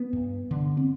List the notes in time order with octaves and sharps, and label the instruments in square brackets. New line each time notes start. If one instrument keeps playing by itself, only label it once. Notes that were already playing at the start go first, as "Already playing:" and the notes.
Already playing: [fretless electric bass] B3
G2
D3
C4